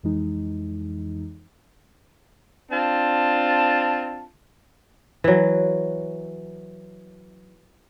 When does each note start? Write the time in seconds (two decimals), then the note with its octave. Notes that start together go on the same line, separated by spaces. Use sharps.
0.03 F2 E3 G#3 D#4
2.71 C4 D4 F4 A5
5.24 E3 F#3